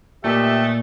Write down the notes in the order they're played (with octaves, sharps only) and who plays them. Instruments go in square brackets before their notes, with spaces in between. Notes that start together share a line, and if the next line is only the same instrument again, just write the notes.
[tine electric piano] A#2 [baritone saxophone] A3 [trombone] G4 [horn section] B4 D#5 E5